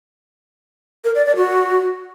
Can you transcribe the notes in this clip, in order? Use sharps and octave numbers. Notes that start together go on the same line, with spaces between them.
A#4
D5
D5
F#4